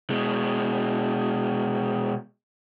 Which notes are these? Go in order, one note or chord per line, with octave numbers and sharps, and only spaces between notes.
B2 G#3